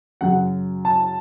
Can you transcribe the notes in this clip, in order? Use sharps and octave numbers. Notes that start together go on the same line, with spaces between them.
F#2 C#3 F#3 F#5
A5